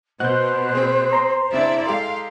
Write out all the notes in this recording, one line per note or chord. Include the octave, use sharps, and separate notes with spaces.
B2 F#4 C5 D#5 F#5 F#6 G6
C4 G#4
A#5 C6
C#3 C4 D4 E4 D5 E5
G#3 G4 A4 F5